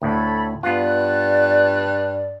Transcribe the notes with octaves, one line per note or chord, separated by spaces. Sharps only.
D2 A2 A4 C#5 B5
G2 B3 F4 D5 F#6